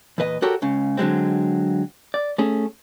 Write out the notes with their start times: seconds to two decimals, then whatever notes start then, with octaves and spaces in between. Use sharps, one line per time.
0.18 E2 A#2 B4 D#5
0.42 F#4 G4 A4 A#4 C#5
0.62 C#2 C#3
0.97 D3 F#3 G#3 C4
2.14 D5
2.38 A3 C#4 G#4